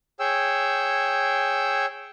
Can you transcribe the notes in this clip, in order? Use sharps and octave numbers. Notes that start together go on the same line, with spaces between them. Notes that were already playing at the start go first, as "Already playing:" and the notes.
G#4 C#5 G5 E6